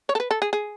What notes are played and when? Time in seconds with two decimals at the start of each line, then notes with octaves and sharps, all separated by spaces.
0.09 C#5
0.15 A4
0.20 B4
0.31 A4
0.42 G#4
0.53 G#4